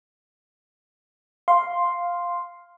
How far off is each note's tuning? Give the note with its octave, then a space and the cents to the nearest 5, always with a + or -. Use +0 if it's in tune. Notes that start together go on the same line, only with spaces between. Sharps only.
F5 +0 C6 +0